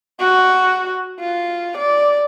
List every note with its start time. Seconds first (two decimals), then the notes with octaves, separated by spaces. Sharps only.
0.20 F#4
1.20 F4
1.78 D5